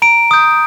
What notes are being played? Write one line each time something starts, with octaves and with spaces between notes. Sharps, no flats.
A#5 D7
D#6 G6